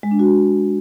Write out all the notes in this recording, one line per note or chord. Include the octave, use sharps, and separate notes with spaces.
G#3
D4
F#4